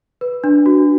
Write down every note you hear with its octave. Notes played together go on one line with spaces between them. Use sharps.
B4
D4
F#4